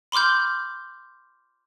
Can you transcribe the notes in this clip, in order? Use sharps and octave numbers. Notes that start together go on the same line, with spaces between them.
B5 C6 D6 F6 G6